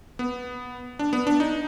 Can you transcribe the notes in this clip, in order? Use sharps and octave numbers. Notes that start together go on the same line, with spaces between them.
B3
D4
B3
D4
D#4